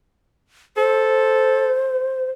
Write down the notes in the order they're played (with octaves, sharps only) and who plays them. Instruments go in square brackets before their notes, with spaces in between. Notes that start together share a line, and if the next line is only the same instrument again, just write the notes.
[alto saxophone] A4 [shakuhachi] C5